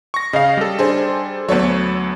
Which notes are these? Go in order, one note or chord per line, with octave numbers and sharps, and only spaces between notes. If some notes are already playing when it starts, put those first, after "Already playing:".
C#6 A#6
C#3 D#5 F5
G3 A4
D4 G#4 C5
D2 F#3 B3 A4 C#5